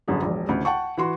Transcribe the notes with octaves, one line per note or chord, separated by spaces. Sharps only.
G1 F#2 D3 G#4
E1 A#1
A1 D2 C#3
F#5 G5 A5 C#6
E3 F#4 C6